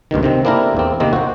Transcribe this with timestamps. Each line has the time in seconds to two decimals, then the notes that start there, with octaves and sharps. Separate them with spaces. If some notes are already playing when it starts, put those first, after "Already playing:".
0.11 D2 G2 B2 D#3
0.23 C3 D#3 C4
0.45 A#3 C4 D4 E4 A4 A#4
0.77 E2 C4
1.00 C3 D#3 A#3 C4 D#4
1.13 F#4 C5